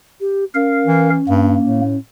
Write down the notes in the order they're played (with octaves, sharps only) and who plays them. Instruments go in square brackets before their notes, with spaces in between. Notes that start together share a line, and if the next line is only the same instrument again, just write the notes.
[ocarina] G4
[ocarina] C#4 [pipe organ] A#4 F5
[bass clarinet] E3
[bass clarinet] G2 [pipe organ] A#3
[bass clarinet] A2